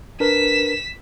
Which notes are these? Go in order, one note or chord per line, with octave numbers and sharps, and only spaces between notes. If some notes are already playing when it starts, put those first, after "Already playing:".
D4 A#4 B4 B6 E7